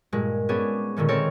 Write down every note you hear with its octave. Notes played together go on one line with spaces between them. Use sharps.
G2 A#2 G#3
B3 C#4 D4 G#4
A#2 D3 D#3 C#4
C4 A4 A#4 C#5